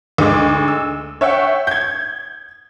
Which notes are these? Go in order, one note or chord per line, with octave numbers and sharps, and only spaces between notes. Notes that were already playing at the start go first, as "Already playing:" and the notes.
D2 G#3 D#4 D6
E6
C#5 E5 F#5 G5
G6 G#6